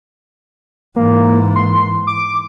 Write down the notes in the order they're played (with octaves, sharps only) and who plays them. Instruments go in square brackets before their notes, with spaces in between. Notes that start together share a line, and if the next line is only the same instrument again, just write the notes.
[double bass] G#2 E3 [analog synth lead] A#3
[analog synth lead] C6
D6